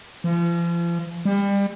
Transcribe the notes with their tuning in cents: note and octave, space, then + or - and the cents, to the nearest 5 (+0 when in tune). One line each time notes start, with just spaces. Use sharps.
F3 -40
G3 +30